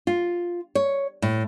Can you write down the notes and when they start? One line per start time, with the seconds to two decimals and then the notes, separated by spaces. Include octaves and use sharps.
0.07 F4
0.75 C#5
1.22 A2